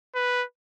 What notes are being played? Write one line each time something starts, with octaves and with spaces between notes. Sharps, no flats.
B4